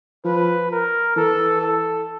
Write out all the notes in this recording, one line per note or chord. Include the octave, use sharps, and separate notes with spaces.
F3 B4
A#4
E3 A4
A4